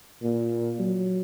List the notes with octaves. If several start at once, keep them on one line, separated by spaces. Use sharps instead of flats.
A#2
F#3